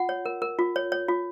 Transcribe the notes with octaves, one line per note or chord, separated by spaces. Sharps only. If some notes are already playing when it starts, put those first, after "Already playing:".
Already playing: F4 F#5
C#5
A#4
A#4
F4
C#5
C#5
F4